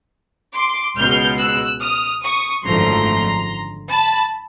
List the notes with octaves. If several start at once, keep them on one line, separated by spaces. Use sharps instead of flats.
C6 D6
C#2 B2 G#3 F6 G6
E6 F#6
D#6 F6
C#6 D#6
G#1 F#2 D3 F3 A3 A#5 C6
A5 B5